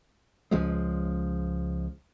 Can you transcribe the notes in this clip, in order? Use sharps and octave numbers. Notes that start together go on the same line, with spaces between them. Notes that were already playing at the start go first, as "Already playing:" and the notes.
C#2 F3 G#3